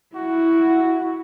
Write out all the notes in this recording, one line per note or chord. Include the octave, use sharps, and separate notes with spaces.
E4 F#4